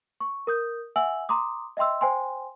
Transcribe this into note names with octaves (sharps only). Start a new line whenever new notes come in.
C#6
A#4 D#6 G6
E5 F#5 G#5 E6 F#7
A#5 C6 D6 D#6
D#5 E5 G5 C6 E6
C5 G5 G#5 C6